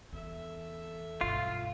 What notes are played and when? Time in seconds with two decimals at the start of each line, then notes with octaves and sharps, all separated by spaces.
0.13 E2 A4 E5
1.21 B1 G2 F4